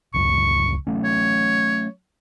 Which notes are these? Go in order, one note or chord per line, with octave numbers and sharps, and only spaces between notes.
D1 C#2 F#2 C#6
F#3 A3 C#4
C#5